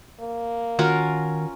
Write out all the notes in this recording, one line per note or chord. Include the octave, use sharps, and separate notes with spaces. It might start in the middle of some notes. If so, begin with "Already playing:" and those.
A#3
D#3 C#4 F4 F#4 A#4